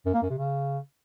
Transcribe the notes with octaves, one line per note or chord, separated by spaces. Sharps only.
F#2
A#3
F#2
C3
C#3